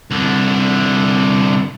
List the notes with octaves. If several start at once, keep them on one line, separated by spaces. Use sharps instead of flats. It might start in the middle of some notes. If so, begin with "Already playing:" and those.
C2 D3